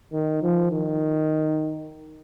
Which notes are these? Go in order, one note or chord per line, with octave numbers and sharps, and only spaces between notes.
D#3
F3
D#3